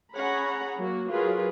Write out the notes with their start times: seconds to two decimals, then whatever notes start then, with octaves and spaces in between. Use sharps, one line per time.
0.13 C#4 G#4 C#5 F#5 A#5 B5
0.78 F#3 A#3 F#4
1.11 F#3 F4 G#4 A#4 B4